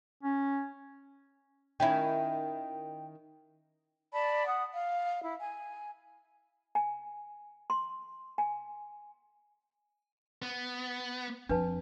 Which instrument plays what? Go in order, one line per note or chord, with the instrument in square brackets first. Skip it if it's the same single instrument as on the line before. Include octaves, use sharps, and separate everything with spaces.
[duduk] C#4
[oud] D#3 C#4 E4 [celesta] G5
[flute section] D5 A5 B5
F#5 D#6
F5
E4
G#5
[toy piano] G#5
C6
G#5
[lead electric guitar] B3
[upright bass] F2 [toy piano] D4 B4 A5